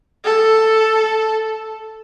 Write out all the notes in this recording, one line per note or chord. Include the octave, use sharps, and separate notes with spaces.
A4